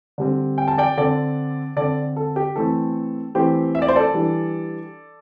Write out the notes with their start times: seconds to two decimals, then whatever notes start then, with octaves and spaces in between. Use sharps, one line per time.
0.18 D3 G3 C4
0.58 G5
0.68 A5
0.78 D5 G5
0.97 D3 C4 A4 D5
1.76 D3 C4 A4 D5
2.16 A4
2.36 G4
2.56 E3 A3 C4 A4
3.35 E3 A3 C4 G4 C5
3.75 E5
3.82 D5
3.88 C5
3.96 A4 D5
4.14 E3 G3 D4